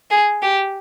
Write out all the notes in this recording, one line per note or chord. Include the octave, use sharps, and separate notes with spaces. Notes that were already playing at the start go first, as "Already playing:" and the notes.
G#4
G4